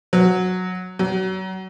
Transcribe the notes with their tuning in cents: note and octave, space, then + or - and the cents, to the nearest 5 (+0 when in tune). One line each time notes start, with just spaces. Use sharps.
F#3 -10
F#3 +30